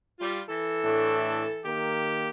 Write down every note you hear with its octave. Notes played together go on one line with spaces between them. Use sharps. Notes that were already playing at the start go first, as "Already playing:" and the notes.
G3 F4
E3 A4
A2 A3 D4
D#3 A#3 G4